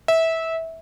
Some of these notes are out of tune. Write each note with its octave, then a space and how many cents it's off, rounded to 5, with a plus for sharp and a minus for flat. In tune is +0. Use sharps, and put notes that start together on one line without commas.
E5 -20